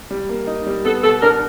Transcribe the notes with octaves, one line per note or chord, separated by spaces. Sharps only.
G3
A#3
D#4
G3
B3 A4
B2 A4
D4 A#4